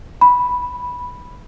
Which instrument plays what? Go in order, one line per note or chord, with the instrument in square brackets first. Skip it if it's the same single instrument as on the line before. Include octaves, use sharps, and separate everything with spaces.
[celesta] B5